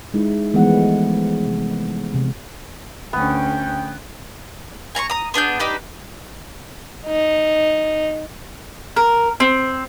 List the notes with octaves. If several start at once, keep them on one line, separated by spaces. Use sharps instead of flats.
G#3 D#4 E4
E3 F3 G#3 A3 B3 F#5
C3
C3
D2 B3 C#4 G5
G#5 A#5 B5 C#6
A#5 D#6
B3 D4 G#4 G6
D4 D#4 G4 B4
D#4
A#4
C4